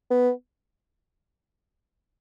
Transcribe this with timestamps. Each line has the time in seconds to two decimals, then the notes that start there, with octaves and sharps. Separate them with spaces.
0.11 B3